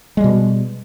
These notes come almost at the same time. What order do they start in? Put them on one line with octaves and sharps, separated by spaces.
G#3 G3 B2